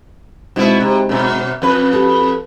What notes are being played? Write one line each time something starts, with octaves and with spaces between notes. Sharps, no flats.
B2 G#3 C4 D#4 E4
C3
F#2 B2
F2 B4
G4 A4